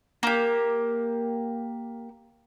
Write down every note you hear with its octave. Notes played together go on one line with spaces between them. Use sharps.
A#3 G4